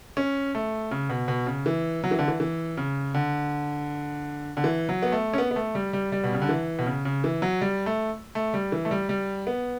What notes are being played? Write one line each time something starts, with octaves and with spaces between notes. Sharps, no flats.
C#4
A3
C#3
B2
B2
C#3
E3
F#3
E3
D3
E3
E3
C#3
D3
D3
E3
F#3
B3
A3
C#4
B3
B3
A3
G3
G3
G3
B2
C#3
D3
E3
B2
C#3
C#3
E3
F#3
G3
A3
A3
G3
E3
A3
G3
G3
B3